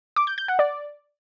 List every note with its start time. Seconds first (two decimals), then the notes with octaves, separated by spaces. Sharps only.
0.16 D6
0.27 G6
0.38 G6
0.48 F#5
0.59 D5